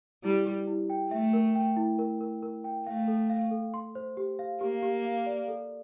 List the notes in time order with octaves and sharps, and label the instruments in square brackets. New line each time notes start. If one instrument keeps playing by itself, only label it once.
[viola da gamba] G3 [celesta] E4
[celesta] G4
E4
G5
[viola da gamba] A3 [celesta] E5
[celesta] A#4
G5
E4
A#4
A#4
A#4
G5
[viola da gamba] A3 [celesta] F5
[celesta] A4
F5
A4
C6
C5
G4
F5
[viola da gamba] A#3 [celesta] G4
[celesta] G4
F5
D5
A4